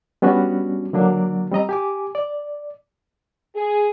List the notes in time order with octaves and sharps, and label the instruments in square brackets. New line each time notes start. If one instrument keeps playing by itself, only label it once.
[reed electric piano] G3 B3 C#4 D4 F#4
D3 F#3 A#3 D4
G3 C4 D#5 A#5
G4 G#5 D6
D5
[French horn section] G#4